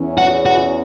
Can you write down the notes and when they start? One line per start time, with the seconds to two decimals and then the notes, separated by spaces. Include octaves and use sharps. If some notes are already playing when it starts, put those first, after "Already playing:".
Already playing: E2 E3 C#4
0.18 F#4
0.46 F#4